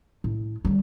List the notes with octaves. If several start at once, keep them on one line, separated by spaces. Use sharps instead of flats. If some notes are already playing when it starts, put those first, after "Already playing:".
A2
D3 G3